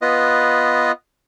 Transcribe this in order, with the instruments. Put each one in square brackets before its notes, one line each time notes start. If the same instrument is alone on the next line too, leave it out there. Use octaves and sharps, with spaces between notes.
[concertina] B3 F4 B4 D#5